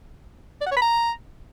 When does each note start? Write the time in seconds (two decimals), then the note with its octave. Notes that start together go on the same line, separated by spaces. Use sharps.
0.61 D5
0.66 F#5
0.71 C#5
0.77 B5
0.82 A#5